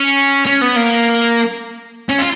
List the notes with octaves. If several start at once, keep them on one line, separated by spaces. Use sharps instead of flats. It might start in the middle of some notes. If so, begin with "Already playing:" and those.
Already playing: C#4
C#4
B3
A#3
C#4
F4